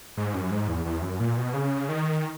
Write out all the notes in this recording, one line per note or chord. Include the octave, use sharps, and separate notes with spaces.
G#2
F#2
G#2
E2
E2
F#2
A#2
B2
C#3
D#3